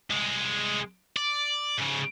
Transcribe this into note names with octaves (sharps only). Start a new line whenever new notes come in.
C2 G#3
D5
G#2 C#3